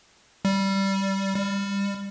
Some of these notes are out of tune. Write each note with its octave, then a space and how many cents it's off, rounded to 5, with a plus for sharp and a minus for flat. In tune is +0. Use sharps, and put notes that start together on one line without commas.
G3 -10
G3 +25